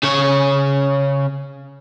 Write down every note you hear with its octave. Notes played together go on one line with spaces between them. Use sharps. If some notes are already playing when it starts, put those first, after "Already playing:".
C#3 C#5